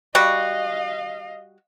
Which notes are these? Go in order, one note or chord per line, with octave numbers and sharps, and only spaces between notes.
G3 F#4 D#5 F5